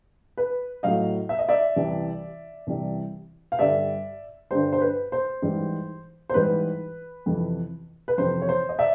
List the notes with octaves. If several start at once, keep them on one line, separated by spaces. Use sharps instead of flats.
B4
A2 F#3 D#5 F5
E5
D#5
D5 E5
C2 C3 E3 G3
C2 C3 E3 G3
F5
G2 D3 G3 D5 E5
G2 D3 G3 C5
C5
B4
C5
G#2 E3 G3
C5
G#2 E3 G3 B4
F2 C3 E3
B4
F2 C3 E3 C5
C#5
C5
D#5
D5 E5